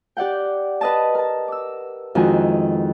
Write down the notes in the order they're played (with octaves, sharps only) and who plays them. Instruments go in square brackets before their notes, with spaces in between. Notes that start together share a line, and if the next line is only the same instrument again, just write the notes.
[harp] G4 D5 F#5 G5
B4 D#5 A5
A#4 A5
D6 E6
F2 D#3 G#3 E4 F#4 G#5